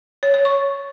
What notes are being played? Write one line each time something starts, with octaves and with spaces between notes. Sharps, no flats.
C#5
C#5
C#6